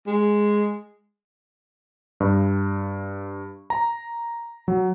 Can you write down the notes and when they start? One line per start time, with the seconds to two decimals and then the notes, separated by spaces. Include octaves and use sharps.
0.07 G#3
2.20 G2
3.70 A#5
4.68 F#3